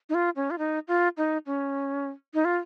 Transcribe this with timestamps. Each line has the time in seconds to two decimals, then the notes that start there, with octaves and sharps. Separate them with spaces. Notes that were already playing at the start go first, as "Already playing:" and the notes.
0.09 D#4
0.14 F4
0.36 C#4
0.51 F4
0.58 D#4
0.88 F4
1.17 D#4
1.46 C#4
2.34 D#4
2.45 F4